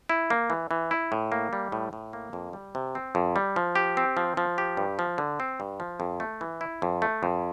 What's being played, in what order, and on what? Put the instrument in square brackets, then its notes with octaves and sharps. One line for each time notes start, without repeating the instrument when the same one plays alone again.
[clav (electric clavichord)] E4
A#3
E3
E3
E4
A2
A#3
G3
A2
A2
A#3
F2
G3
C3
C4
F2
G3
F3
G4
C4
F3
F3
G4
G2
F3
D3
C4
G2
F3
F2
A3
E3
E4
F2
A3
F2